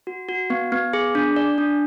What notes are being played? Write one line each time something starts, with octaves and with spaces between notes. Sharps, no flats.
F#4
F#4
B3
B3
G#4
D4
D5
D4